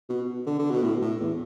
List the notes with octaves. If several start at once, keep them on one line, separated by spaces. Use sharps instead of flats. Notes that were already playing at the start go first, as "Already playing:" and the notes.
B2
D3
D3
B2
A2
A2
E2